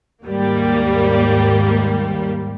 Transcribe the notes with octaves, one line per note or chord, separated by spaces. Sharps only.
D#2 G#2 G3 A#3